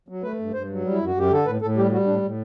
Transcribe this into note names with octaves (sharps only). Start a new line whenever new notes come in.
F#3
A3 B4
G2
G2 C5
F#3
G3
E4
F#2
F#4
F#2 G4
D3 A4
A2 B4
A2 A4
G3 G4
G3 F#4
A2 D4
A2